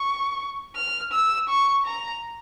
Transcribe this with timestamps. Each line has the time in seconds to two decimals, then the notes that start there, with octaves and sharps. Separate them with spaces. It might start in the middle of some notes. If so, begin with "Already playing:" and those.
Already playing: C#6
0.76 F6
1.12 E6
1.49 C#6
1.86 A#5